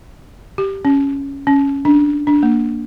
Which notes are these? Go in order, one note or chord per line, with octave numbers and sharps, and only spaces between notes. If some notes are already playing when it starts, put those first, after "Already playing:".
G4
C#4
C#4
D4
D4
A#3